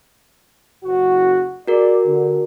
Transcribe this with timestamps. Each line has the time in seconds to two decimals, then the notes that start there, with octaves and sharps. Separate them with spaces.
0.84 F#1 F#4
1.68 F#4 G#4 A#4 D5
2.06 D3